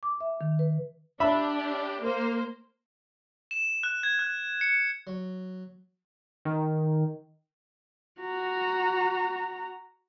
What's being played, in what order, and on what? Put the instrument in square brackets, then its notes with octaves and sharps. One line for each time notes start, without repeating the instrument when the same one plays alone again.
[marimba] D6
E5
D#3
B4
[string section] D4 G4 [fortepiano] E5 B5
[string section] A#3 C5
[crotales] E7
F#6
G#6
F#6
C#7
[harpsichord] F#3
[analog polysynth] D#3
[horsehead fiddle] F#4 A#5